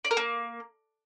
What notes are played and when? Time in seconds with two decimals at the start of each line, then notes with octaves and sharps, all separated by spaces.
0.05 D5
0.11 A#4
0.17 A#3